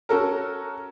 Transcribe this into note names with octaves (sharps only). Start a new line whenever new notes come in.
C#4 F#4 A4 A#4